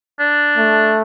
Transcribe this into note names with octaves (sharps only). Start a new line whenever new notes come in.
D4
A3